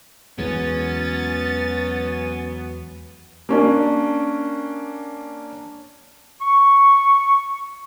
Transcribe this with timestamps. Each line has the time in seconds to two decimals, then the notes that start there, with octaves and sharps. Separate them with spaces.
0.39 E2 E3 F#3 G#3 B3 C#4 A6
3.49 A#3 C#4 D4
6.41 C#6